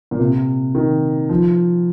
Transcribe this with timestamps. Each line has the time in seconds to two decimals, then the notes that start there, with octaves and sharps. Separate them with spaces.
0.11 A#2
0.20 C3
0.75 D#3
1.29 F3